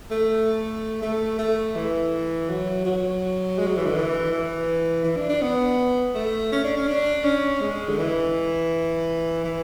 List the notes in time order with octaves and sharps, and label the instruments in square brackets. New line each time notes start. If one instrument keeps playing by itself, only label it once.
[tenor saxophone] A3
A3
A3
E3
F#3
F#3
G#3
F#3
E3
D3
E3
E3
E3
D4
D4
B3
A3
C#4
D4
C#4
D4
C#4
G#3
D3
E3
E3